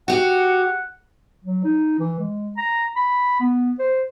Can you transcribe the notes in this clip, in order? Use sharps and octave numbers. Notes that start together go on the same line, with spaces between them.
F#4 G4 F#5
F#3
D#4
E3
G#3
A#5
B5
B3
C5